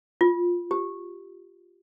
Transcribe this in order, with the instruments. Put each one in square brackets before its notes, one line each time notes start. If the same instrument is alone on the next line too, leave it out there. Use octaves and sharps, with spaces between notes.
[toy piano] F4
G4